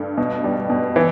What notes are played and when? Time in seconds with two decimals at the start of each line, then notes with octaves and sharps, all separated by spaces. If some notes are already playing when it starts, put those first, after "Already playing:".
Already playing: G2 A3
0.18 B2
0.44 G3
0.70 B2
0.96 E3